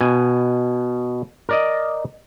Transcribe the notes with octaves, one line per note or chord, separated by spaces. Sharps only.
B2 G#5
A#4 D5 D#5